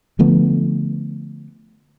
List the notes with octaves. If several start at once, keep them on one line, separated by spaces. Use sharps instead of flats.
D3 F3 A3 B3